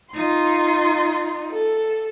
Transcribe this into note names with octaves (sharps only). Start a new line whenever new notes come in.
D#4 F4 C6
A4